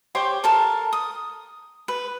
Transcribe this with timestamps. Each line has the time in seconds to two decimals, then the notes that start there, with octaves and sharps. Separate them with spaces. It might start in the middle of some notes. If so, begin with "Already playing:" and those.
0.15 G4 C5 C#5 D6
0.44 A4 A#4 A5
0.93 D#6
1.88 B4